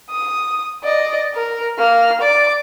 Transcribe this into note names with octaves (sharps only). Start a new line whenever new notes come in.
D#6
D5 D#5
A#4
A#3 F6
D5 D6